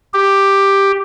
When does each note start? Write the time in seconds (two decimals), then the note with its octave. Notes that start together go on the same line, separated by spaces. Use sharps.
0.14 G4